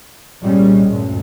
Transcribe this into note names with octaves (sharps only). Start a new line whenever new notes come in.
C2 A#2 G3 G#3 C#4
D2 G2 A#2